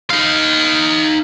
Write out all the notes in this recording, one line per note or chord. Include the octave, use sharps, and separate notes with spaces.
D#4 F5